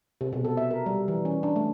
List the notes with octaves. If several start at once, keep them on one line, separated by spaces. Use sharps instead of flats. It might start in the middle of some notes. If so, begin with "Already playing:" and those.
C3
B2
A4
E5
A#4
G3
E3
C#4
D4
A3